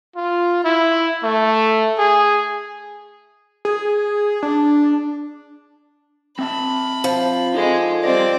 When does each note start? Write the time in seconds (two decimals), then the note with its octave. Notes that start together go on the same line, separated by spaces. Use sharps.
0.16 F4
0.65 E4
1.24 A3
1.98 G#4
3.65 G#4
4.43 D4
6.39 C4 E5 A5 B5
7.04 F3
7.54 G#3 D#4 A4
8.04 G3 C4 D5 D#5